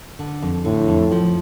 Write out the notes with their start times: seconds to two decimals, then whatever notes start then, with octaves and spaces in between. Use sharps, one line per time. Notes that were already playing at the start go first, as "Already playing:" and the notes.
0.19 D3
0.42 F2
0.65 A2 D3
0.88 F2
1.12 F3